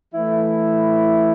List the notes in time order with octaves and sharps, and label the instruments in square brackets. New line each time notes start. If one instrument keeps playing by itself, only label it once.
[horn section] E3 A3 E4